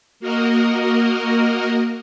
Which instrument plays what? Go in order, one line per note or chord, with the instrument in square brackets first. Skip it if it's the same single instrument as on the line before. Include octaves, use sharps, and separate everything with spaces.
[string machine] A#3 F#4 A#4 D#5